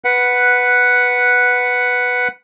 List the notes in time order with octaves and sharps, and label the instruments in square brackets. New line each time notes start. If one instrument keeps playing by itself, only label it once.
[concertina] B4 F#5